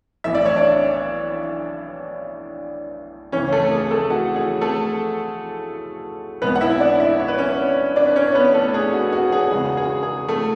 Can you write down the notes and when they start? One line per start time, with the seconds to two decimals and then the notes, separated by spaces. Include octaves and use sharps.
0.24 B1 A2 E3 E5
0.35 D5
0.45 C#5
0.56 D4 D5
3.32 D2 C#3 E3 C#4 C#5
3.52 A3 A4
3.71 G#4
3.91 A3 A4
4.10 F#4
4.36 G#4
4.61 A3 A4
6.42 B1 B2 G#3 B3 B4
6.56 F#5
6.61 E4 E5
6.80 D4 D5
7.00 E4 E5
7.19 C#5
7.28 B4
7.38 C#4 C#5
7.96 D4 D5
8.07 B4
8.16 C#4 C#5
8.35 B3 B4
8.54 A3 A4
8.74 G#4
8.93 F#4
9.12 F#4
9.32 G#4
9.51 E2 C#3 G#3 F#4
9.77 G#4
10.03 G#4
10.28 A3 A4